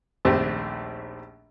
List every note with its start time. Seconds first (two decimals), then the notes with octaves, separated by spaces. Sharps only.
0.25 A#1 D#2 A3 C4 G4